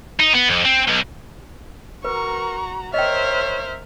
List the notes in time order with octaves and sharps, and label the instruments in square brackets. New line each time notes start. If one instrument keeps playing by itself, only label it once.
[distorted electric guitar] D#4
B3
F2
C4
B1
[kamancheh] F#4 A#5 [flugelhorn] A#4 [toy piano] B4 [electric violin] C#6
[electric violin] A#4 F6 [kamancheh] C5 E5 [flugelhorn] C#5 [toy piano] D#5 G5